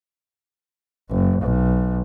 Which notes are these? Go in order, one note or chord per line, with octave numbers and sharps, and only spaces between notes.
F#1
B1